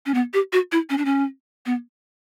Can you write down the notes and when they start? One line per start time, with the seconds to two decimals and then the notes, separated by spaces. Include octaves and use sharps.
0.06 C#4
0.14 B3
0.34 G4
0.53 F#4
0.72 E4
0.90 C#4
0.98 D4
1.05 C#4
1.66 B3